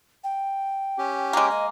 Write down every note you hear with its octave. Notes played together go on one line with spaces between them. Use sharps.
G5
C#4 G4
G#3 A#3 D6
D#5